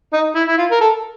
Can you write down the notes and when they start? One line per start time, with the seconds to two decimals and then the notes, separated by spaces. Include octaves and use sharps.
0.13 D#4
0.35 E4
0.47 E4
0.58 F4
0.71 A#4
0.81 A4